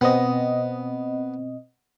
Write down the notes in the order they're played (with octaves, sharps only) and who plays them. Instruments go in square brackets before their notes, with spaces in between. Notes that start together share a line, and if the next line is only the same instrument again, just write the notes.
[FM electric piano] B2 C4 D#5 [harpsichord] B3